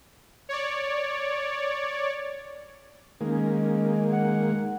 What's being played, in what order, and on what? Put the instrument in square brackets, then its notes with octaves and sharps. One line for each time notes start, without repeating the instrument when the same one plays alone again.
[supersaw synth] C#5 D5
[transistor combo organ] D#3 G#3 A#3 [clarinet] C#4
[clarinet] F#5